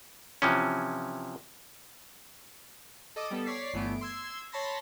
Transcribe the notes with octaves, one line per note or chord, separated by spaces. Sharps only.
C3 E3 F3 C#4
A4 D#5 D6 D#6
G3 B3 A4
C#5 D5 B6 C7
G1 E3 A3 B3 D7
C6 E6 G#6
C#5 A5 B5 C6 A#6